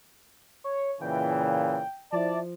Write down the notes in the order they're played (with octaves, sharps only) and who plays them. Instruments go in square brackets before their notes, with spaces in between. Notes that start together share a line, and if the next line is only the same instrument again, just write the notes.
[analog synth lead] C#5
[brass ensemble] A#2 C#3 E3 [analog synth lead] G5
[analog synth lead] F3 [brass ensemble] E4 D5 A5